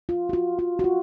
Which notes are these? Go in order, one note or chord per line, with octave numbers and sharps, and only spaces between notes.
F4
F#4
F4
F4
F#4
F4